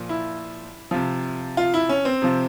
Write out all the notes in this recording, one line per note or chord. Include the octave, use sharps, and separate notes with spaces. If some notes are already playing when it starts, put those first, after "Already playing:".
Already playing: A#2 F3
E4
C3 F3
F4
E4
C#4
C4
C3 F3